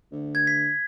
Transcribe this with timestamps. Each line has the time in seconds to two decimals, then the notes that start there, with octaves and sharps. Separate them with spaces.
0.12 D2
0.35 G#6
0.47 B6